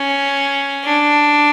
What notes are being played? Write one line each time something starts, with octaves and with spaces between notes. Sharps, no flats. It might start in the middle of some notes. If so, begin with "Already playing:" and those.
Already playing: C#4
D4